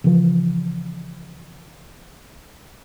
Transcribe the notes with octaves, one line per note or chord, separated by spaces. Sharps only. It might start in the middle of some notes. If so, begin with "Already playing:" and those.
C#3 E3 F3